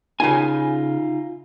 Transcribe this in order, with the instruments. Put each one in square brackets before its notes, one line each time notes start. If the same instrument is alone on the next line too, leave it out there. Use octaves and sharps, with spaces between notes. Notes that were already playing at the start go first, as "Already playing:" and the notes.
[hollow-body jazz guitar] C#3 G#5 [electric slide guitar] D#4 F4